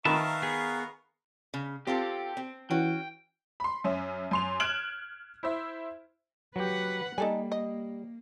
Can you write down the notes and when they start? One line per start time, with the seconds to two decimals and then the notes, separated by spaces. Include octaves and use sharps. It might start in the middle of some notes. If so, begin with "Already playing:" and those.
0.05 D#3 A#4 B4 E5 F5 A5 C#6
0.42 B3 G#4
1.54 C#3
1.87 C4 F4 G4 A4
2.37 C4
2.70 E3 C#4 F#4 G5
3.60 B5 C6
3.84 F#2 C#4 E5
4.31 F#2 C6 F7
4.60 F6 F#6 G#6 D7 E7 F#7
5.43 E4 C5 E5
6.56 F#3 G4 B4 F#5
7.18 G3 A#3 D#4 A4 G#5
7.52 D#5